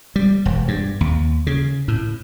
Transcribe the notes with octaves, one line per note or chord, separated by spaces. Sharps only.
G3
E1
G2
D#2
C#3
A2